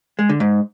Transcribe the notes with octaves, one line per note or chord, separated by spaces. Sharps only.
G#3
D3
G#2